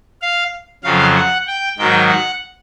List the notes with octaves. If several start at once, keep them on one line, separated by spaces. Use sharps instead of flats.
F5
F2 C#3 F#3 F5
F#5
G5
G#2 D#3 F#3 G5
F#5